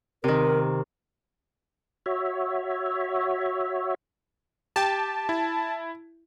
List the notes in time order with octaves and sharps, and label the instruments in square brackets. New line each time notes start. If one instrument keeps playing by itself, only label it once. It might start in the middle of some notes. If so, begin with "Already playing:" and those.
[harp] C3 D#3 [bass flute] A#4
[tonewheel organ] F#4 C#5 E5
[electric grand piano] G4 G5 [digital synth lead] A5
[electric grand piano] E4